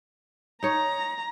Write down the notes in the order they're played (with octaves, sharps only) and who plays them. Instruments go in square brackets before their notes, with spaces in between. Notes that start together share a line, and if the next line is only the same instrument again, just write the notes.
[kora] D#4 C#5 [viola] A#5